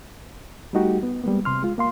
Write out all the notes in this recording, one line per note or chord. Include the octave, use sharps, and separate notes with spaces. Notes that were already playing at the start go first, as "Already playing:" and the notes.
G3 A3 D#4 F#4 G4
B3
G3 G#3 A#3 B3
C3 C6 F6
G#3 F4
A#3 F5 C6